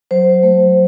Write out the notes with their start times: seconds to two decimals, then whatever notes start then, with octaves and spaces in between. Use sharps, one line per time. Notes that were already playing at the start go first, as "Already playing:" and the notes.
0.11 F#3 C5
0.43 A3